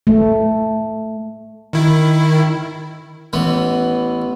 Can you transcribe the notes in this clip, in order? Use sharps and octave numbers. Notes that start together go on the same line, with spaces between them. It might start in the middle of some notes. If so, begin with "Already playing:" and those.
A3
D#3 E4
A1 E3 B3